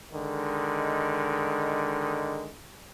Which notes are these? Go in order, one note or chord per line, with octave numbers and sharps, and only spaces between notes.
D3 D#3 G#3